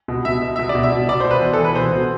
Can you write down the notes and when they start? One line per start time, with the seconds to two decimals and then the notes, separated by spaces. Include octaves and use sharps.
0.08 B2
0.25 B2 E5
0.42 B2
0.56 B2 E5
0.69 D5
0.75 B2
0.83 E5
0.92 B2
1.09 B2 D5
1.20 B2 C5
1.31 B4
1.42 E3
1.53 A4
1.59 E3
1.64 B4
1.75 B2 C5
1.92 B2